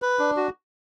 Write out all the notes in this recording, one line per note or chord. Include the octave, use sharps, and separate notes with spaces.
B4
D4
F#4